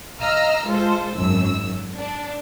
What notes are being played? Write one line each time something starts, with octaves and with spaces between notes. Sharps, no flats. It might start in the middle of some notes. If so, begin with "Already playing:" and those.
D#5 F5 A#5 E6 F6
G#3 F4 A4 C5
G#1 F#2 E6
D4